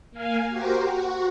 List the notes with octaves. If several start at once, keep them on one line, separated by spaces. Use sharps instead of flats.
A#3 F5 G#5
F#4 G4 A#4 C5
F#4